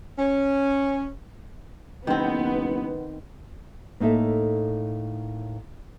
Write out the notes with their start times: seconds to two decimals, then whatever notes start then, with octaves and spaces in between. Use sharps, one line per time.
0.19 C#4
2.07 F#1 D#3 B3 C4
4.00 A2 A#3 D#4 A4 E5